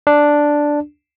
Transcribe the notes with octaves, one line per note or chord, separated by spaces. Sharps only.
D4